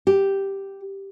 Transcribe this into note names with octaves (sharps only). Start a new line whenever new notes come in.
G4